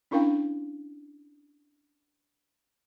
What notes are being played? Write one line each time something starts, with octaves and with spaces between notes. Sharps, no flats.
C#4 D4 E4 A#4 F5 G5